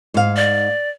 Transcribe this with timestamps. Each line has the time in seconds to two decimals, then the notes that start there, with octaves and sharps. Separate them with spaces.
0.14 G#2 F5
0.36 D5